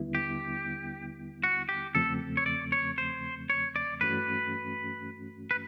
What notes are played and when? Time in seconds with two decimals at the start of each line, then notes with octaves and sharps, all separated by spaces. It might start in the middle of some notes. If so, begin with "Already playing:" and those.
Already playing: D#2 D3 G3 B3 E4
0.15 G4
1.44 F#4
1.69 G4
1.95 E2 C#3 F3 A3 C4 A4
2.37 C#5
2.46 D5
2.72 C#5
2.98 C5
3.50 C#5
3.76 D5
4.01 G2 E3 A3 C#4 F#4 B4
5.51 B4